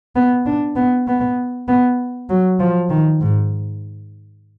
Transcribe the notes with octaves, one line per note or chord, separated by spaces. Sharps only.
B3
D4
B3
B3
B3
F#3
F3
D#3
G#2